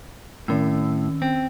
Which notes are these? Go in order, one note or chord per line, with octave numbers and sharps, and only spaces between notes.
A2 D#3 C#4 E6
C4